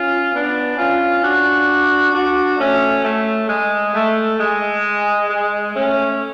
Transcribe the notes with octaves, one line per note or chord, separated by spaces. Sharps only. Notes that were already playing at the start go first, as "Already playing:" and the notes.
Already playing: C#4 F4
B3 D4
C#4 F4
D4 F#4
D4 F#4
A3 C#4
A3
G#3
A3
G#3
G#3
A3 C#4